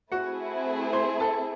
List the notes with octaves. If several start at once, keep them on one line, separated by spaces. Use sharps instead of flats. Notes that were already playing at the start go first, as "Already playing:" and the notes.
A3 C4 E4 F#4 G#4 F#5
C5 C6
A4 A5